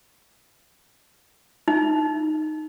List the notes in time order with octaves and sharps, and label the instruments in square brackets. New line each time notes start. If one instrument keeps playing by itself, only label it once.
[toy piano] D#4